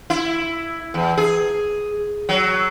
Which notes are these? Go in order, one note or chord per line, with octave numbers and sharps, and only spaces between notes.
E4
E2
G#4
F#3